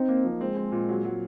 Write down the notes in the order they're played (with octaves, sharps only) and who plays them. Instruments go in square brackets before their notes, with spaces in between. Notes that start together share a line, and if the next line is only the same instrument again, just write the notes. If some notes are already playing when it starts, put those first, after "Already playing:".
Already playing: [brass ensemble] C4 [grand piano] D#4
[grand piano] A#3
F3
[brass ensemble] G#3 [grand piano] C4
[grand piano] C4
A#2
F#3
F#3